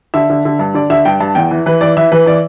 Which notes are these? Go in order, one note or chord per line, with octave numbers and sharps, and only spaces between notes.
D3 E5
D3
D3
G2
D3 D5
D3 E5
G2 G5
G2 A5
E2 G5
E3
E3 B4
E3 D5
E3 E5
E3 B4
E3 D5